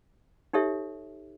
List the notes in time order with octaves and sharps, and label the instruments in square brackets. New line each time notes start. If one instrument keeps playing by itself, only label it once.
[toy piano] D#4 G4 A4 C#5 E5